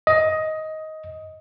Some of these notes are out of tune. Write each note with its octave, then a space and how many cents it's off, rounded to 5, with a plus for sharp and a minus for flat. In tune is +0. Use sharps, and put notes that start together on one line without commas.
D#5 +15